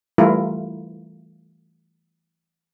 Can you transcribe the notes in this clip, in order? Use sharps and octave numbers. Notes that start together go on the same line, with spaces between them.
E3 G3 A3 E4 F4 A#4